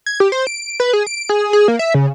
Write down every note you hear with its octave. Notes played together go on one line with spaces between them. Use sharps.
G#6
G4
C5
D7
B4
G#4
D7
G#4
G#4
A#3
E5
C#3